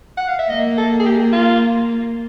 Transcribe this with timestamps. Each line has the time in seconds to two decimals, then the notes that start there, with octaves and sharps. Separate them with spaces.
0.17 F#5
0.28 F5
0.39 E5
0.50 A#3 D#5
0.78 A4
1.00 G#4
1.06 G4
1.33 F4